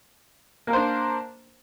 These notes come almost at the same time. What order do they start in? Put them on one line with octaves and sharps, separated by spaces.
A#3 A#4 C5 D4